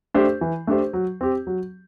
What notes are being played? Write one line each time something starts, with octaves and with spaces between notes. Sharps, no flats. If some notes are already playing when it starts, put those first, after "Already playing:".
A3 D4 G4 C5
E3
A3 D4 G4 C5
F#3
C4 G4
F#3